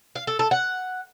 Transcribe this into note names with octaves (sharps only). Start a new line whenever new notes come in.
F5
A4
A4
F#5